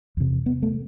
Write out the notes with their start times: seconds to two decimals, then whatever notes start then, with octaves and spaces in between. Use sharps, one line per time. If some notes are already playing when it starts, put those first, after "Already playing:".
0.17 E2 C3
0.46 B3
0.63 A3